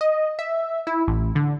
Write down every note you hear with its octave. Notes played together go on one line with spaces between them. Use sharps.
D#5
E5
E4
A1
D3